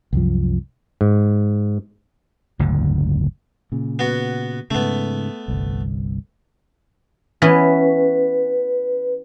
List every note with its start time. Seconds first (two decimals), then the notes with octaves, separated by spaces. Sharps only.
0.13 C2 F#2 F3
1.01 G#2
2.59 F#1 D2 G#2 D3
3.72 A#2 C#3
3.99 B3 F#4
4.71 G#2 C#3 A3 B3
5.48 G1 C2
7.42 E3 B3 C#4 B4